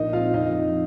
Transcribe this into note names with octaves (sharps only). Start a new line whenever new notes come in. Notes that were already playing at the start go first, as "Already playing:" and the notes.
Already playing: A#1 A#3 D#4 D#5
C4 F4 F5
F2 D#4 D#5
F2